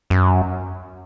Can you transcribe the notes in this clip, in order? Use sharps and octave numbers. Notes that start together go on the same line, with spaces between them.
F#2